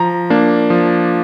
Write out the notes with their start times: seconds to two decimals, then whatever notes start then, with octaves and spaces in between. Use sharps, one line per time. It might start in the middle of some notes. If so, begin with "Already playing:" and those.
Already playing: F3 A#5
0.30 A#3 D4
0.70 F3